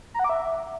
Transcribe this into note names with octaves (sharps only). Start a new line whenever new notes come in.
A#5
F#5
D6
E5